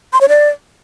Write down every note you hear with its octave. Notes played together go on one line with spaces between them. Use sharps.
C6
C#5
D5